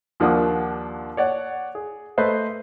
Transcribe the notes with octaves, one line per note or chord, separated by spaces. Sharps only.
D#2 F3 A#3 D4 F#5 D#6
C#5 D5 F#5
G#4
A3 B4 C5 D#5